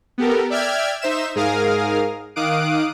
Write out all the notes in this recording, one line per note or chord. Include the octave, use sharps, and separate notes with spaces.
B3 G4 A4 A#4
D5 E5 G5 F6 G#6
D#4 C5 E5 E7
G#2 G#4 A#4 F5 D#6 F6
D#3 F5 D6 D#6 F#6 D7